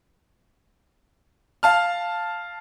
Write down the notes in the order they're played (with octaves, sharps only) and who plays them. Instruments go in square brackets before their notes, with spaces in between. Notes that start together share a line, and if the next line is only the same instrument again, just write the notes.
[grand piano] F5 A5 F6